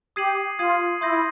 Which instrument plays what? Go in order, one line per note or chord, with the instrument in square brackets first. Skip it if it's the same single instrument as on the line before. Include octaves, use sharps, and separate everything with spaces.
[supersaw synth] G4 [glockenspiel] D#6 G#6 C7 D#7 F#7
[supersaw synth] F4 [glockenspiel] D#6 G#6 C7 D#7 F#7
[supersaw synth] E4 [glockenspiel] C6 D#6 G6 A#6 D#7